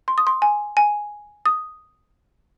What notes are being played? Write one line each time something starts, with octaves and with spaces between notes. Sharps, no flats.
C6
D#6
C6
G#5
G#5
D#6